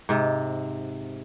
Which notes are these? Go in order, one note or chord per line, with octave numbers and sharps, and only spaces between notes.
G#2 C3